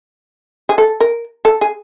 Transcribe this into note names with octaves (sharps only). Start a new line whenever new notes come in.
G#4
A4
A#4
A4
G#4